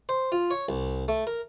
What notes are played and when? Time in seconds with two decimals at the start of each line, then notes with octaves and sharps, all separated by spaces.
0.09 C5
0.32 F4
0.51 C#5
0.69 C2
1.08 A3
1.27 A#4